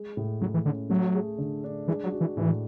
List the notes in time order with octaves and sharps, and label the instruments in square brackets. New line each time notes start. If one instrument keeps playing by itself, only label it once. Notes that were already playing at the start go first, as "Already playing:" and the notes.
Already playing: [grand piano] G#3
A2
[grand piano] A2 [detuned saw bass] F#3
[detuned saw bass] E3
[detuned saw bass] D3 [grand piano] C#4
[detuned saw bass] F#3 [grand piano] A3
[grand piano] G#4
D3
D4
[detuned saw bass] E3 [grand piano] G#3
[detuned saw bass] F#3
[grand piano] F#4
[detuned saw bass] E3
[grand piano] A2 [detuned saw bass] E3